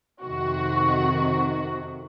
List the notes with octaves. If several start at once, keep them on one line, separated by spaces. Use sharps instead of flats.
F2 C3 D#3 F#4